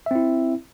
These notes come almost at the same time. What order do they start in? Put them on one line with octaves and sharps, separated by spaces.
E5 C4 E4